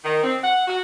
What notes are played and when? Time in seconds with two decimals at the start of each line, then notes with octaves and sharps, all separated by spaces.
0.05 D#3
0.23 C4
0.44 F#5
0.68 F#4